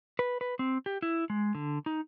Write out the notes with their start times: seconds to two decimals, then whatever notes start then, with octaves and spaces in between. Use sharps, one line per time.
0.19 B4
0.41 B4
0.59 C4
0.86 G4
1.02 E4
1.30 G#3
1.55 D3
1.86 D#4